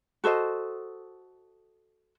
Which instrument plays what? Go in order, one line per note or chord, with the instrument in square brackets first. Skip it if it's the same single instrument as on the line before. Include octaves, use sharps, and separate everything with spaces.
[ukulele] F#4 A4 C5 D#5